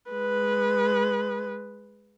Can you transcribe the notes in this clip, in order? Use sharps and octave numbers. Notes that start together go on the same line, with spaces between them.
G#3 B4